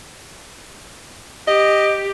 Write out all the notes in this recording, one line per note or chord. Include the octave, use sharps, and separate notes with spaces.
G4 D#5